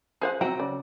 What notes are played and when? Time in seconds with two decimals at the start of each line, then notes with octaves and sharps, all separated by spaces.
0.21 F3 G#4 C5 F#5
0.41 F#3 C4 F#4 G5 A#5
0.60 C#3 D5